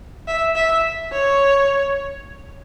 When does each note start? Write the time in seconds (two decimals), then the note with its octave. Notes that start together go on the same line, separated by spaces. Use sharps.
0.28 E5
0.55 E5
1.12 C#5